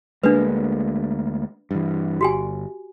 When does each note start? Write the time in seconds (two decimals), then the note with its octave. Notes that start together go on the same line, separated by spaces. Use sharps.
0.23 D2 G#3 A#3 D4 B4
1.71 G2 E3
2.21 G1 F#4 G4 G#5